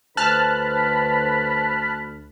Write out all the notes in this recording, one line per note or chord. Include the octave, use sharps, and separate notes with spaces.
D2 D3 B4 C5 A5 B5 F6 F#6